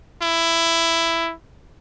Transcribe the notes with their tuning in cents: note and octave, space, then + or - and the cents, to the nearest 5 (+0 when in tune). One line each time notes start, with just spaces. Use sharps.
E4 +10